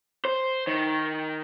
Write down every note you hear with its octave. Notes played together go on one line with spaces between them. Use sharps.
C5
D#3